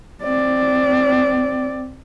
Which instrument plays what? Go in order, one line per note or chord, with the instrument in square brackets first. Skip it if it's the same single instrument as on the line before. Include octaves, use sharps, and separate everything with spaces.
[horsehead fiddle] C4 D5